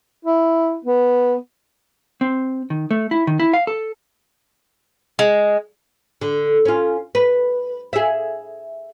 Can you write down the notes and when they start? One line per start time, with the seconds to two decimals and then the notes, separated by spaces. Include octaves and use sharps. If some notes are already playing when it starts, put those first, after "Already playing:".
0.25 E4
0.85 B3
2.21 C4
2.70 D#3
2.91 A3
3.11 E4
3.27 D#3
3.40 E4
3.53 F5
3.67 A4
5.19 G#3
6.21 D3
6.65 C#4 F4
7.15 B4
7.93 G#4 E5